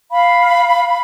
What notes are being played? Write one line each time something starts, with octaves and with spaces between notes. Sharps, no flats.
F5 B5